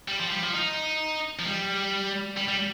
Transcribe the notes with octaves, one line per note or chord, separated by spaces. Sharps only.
G3
F3
G3
F3
D#4
F3
G3
G3
G3